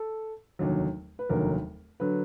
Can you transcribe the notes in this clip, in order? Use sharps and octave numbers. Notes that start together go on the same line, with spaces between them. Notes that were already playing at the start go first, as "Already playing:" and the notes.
Already playing: A4
F1 D#2 D3 F#3
B4
F1 D#2 D3 F#3 A#4
D3 F#3 B4